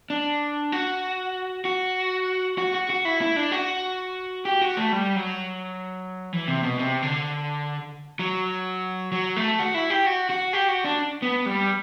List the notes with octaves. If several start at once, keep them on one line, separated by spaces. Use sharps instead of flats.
D4
F#4
F#4
F#4
F#4
F#4
E4
E4
D4
F#4
G4
F#4
A3
G3
F#3
E3
C3
B2
C3
D3
F#3
F#3
A3
F#4
E4
G4
F#4
F#4
G4
F#4
D4
B3
G3